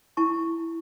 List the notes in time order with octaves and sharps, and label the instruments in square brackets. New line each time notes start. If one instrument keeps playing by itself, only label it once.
[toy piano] E4 A5 C#6